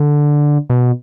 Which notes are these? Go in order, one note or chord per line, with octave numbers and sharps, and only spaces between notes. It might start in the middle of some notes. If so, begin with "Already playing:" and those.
Already playing: D3
B2